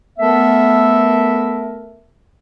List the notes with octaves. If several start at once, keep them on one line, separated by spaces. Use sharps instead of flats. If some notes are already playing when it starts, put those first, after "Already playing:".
A3 B3 A4 A#4 E5